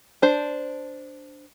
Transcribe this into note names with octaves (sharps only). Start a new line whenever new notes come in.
D4 C5